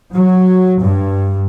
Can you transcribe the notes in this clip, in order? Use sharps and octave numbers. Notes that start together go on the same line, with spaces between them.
F#3
G2